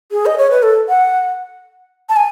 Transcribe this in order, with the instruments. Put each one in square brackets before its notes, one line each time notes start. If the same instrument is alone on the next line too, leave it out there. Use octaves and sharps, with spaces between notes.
[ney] G#4
D#5
C#5
B4
A4
F#5
A5
G#5